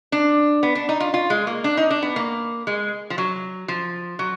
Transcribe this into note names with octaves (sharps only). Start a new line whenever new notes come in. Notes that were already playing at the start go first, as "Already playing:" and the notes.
D4
B3
D4
D#4
F4
F4
G#3
A#3
D4
D#4
D4
B3
A#3
G#3
F3
F#3
F3
F#3